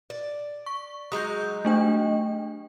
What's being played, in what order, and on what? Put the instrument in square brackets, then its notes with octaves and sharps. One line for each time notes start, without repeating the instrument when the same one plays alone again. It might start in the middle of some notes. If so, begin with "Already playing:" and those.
[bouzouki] D5
[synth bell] C#6
[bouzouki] F#3 G#3 D#4 [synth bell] D#6 G6
[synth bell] A3 D4 G5